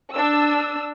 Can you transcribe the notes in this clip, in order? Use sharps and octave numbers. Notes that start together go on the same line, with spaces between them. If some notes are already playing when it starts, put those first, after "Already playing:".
D4 E6